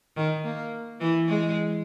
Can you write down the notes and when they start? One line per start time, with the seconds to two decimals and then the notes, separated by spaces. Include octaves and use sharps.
0.17 D#3
0.44 A#3
1.01 E3
1.29 G#3